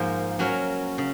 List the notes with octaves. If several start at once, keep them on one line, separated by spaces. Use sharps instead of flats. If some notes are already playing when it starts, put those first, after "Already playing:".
Already playing: G#2 F3 A#3
F#3 C#4 F#4 A#4 C#5
C#3